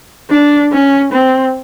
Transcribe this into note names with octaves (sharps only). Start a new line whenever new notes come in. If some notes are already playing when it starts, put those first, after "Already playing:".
D4
C#4
C4